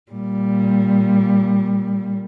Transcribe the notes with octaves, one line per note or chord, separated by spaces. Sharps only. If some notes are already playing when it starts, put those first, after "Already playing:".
A#2 G3